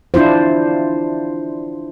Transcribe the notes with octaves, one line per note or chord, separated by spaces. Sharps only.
D4 E4 F4 C5